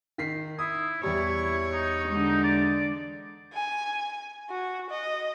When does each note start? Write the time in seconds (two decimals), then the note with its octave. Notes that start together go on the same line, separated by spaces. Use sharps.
0.18 D#3 B6 C7
0.59 E4 D#6
1.03 E2 G3 E4 C#5
1.72 D#4
2.08 D3 G#3
2.44 D5
3.54 G#5
4.50 F#4
4.90 D#5